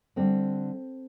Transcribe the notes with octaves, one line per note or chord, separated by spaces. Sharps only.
D3 G3 C4